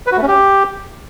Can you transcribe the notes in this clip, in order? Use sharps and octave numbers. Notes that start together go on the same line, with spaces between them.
B4
F#4
A3
C#4
G4